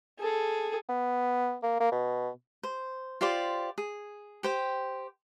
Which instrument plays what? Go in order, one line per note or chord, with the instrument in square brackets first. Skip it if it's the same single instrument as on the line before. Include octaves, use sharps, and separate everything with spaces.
[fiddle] G#4 A4
[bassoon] B3
A#3
A#3
B2
[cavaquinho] C5
F4 G4 C5 D5
G#4
G4 C5 G5